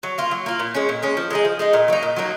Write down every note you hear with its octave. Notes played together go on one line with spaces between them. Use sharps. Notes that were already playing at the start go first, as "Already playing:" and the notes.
F#3
A#3 F4
F#3
A#3 F4
A#2
G#3 C#4
A#2
G#3 C#4
F3
G#3 D#4 G#4
F3
G#3 D#4 G#4
A#2
F#3 A#3 D#4
A#2
F#3 A#3 D#4